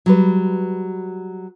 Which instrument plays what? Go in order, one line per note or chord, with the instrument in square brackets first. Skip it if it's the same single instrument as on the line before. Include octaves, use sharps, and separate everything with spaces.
[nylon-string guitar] F#3 G3 B4